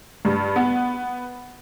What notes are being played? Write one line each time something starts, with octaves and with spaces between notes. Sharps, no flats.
G2
B3